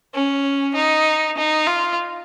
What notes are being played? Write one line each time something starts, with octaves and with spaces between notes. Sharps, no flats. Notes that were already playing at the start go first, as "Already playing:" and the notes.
C#4
D#4
D#4
F4